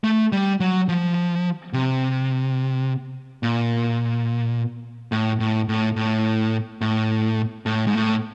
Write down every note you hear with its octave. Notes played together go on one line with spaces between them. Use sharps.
A3
G3
F#3
F3
C3
A#2
A2
A2
A2
A2
A2
A2
G#2
A2